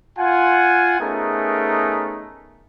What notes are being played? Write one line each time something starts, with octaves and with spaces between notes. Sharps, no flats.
F4 F#5 G#5
A3 B3 C#4 D#4 G#4 A#4